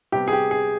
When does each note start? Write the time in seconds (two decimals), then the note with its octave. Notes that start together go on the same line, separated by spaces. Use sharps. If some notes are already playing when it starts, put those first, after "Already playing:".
0.12 C3 G3 B3 G4
0.28 G#4
0.33 G4
0.51 G#4